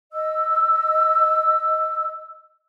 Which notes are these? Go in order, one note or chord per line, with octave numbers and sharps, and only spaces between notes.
D#5 E6